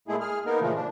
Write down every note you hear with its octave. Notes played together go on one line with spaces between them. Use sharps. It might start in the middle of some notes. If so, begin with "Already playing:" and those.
A#2 G#3 A3 E4 G#4
G#4 F6
A#3 B3 D#4 A#4
A#2 C#3 E3 F3 A3
D4